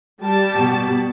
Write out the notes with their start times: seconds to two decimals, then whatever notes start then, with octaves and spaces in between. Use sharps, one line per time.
0.20 G3 G4 A5
0.54 B2